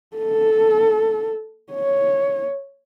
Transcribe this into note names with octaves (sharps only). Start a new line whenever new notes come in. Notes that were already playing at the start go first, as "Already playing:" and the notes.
A4
C#5